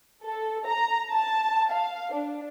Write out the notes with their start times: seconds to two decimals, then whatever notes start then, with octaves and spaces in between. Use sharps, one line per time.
0.23 A4
0.66 A#5
1.13 A5
1.71 F5
2.13 D4